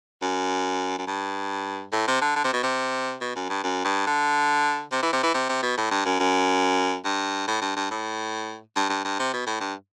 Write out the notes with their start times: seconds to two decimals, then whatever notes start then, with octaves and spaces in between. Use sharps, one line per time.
0.22 F#2
0.99 F#2
1.07 G2
1.93 A2
2.08 C3
2.21 D3
2.36 D3
2.44 C3
2.53 B2
2.63 C3
3.21 B2
3.36 F#2
3.50 G2
3.63 F#2
3.84 G2
4.07 D3
4.92 C3
5.03 E3
5.13 C3
5.23 E3
5.34 C3
5.49 C3
5.63 B2
5.78 A2
5.91 G2
6.05 F#2
6.20 F#2
7.05 G2
7.48 A2
7.62 G2
7.76 G2
7.91 A2
8.76 G2
8.89 G2
9.05 G2
9.20 C3
9.34 B2
9.47 A2
9.61 G2